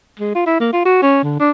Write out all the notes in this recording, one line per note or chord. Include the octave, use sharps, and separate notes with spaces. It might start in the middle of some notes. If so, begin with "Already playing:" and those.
G#3
F4
E4
A#3
F4
F#4
C#4
D3
D4